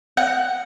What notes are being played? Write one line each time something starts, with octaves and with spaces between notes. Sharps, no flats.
F#5